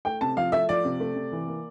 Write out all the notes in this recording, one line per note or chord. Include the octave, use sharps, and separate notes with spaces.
A3 G5
C3 A5
F3 F5
A3 E5
F3 D5
C3
A3
C3
E3
A#3